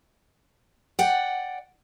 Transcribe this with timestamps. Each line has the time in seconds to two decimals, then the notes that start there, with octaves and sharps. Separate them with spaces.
0.99 D5 F#5 G5